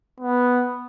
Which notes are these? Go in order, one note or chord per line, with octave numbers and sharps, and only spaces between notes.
B3